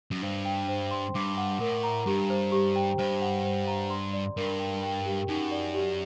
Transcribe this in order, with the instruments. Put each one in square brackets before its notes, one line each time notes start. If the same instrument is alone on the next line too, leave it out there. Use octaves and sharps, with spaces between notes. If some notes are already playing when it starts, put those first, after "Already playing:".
[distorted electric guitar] F#2
[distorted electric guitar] G2 [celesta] C5
[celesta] G5
C5
C6
[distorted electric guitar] G2 [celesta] D6
[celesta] F#5
[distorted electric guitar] A2 [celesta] A#4
[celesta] A#5
[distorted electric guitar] G2 [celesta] G4
[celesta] C5
G4
G5
[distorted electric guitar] G2 [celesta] C5
[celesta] F#5
C5
A#5
C6
D5
[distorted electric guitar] G2 [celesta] A#4
[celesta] G5
G5
G4
[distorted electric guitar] F#2 [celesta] D#4
[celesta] D5
G4